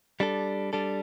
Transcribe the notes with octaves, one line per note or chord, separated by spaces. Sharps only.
G3 D4 A4
G3 D4 A4